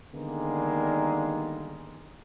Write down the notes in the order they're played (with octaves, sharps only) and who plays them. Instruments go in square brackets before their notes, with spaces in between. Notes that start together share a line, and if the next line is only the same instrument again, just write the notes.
[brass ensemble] D3 D#3 G3 G#3 A#3 B3